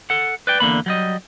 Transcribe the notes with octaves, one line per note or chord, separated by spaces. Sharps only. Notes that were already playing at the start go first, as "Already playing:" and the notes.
A4 F#5
B4 D5 G5
E2 D3 A#3 B5
F#3 G3 D#5